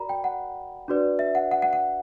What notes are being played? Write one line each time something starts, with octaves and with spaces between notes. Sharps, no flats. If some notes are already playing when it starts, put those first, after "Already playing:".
Already playing: F#4 A#4 D5 A#5 B5
G5
F#5
D4 F#4 B4 D5
E5
F#5
F#5
F#5
F#5